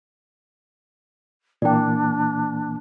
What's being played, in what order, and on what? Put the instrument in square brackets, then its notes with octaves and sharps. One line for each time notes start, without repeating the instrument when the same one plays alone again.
[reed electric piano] A#2 E3 A#3 [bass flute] D4 [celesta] D5 G5